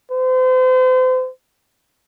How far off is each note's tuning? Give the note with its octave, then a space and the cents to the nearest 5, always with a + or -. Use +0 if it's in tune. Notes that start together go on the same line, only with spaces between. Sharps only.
C5 -35